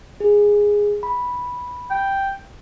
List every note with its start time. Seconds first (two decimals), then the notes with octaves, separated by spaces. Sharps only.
0.20 G#4
1.03 B5
1.91 G5